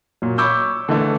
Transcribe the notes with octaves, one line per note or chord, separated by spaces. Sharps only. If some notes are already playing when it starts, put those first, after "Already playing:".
A#2 F#3
C#5 B5 C#6 D6 E6 G6
D3 E3 A3